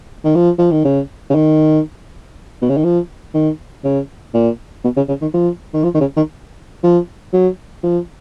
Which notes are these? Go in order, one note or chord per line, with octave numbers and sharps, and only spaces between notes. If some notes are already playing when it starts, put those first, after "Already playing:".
D#3
F3
F3
D#3
C#3
C#3
D#3
B2
C#3
D#3
F3
D#3
C#3
A#2
B2
C#3
C#3
D#3
F3
D#3
F3
D#3
C#3
D#3
F3
F#3
F3